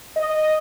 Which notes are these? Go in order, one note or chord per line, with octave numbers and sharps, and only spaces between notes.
D#5